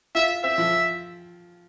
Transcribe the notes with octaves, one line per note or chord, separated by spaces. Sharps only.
F4 E5
C4 E5
F3